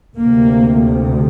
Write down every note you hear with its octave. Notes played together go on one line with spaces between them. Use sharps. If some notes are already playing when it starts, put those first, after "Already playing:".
D2 C3 A#3